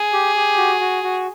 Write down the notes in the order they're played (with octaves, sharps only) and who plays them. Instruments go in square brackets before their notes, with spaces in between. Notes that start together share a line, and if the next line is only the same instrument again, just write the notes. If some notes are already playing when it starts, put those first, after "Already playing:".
Already playing: [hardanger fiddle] G#4
[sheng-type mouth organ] G4
G4
F#4
F#4
F#4